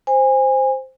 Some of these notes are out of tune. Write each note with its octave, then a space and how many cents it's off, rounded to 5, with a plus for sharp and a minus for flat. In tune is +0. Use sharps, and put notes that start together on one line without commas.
C5 +0 G#5 -25